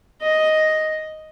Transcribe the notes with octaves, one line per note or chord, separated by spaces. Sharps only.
D#5